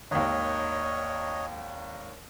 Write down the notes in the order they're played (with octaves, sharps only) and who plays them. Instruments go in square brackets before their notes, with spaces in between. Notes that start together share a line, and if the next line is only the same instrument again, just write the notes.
[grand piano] G#1 D#2 [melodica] C#5 D#5